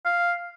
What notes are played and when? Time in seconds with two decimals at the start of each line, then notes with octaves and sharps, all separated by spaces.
0.05 F5